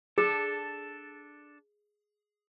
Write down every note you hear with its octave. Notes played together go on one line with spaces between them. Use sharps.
D4 G#4 A4